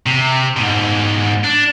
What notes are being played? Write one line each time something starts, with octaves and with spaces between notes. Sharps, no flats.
C3
G#2 B2
D4